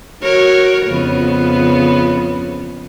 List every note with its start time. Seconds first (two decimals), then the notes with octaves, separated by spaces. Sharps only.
0.22 F#4 A#4 C#5
0.87 F2 C#3 B3